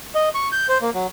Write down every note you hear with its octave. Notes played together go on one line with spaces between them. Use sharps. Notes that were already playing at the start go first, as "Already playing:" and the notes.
D#5
C#6
G6
C5
A#3
F#3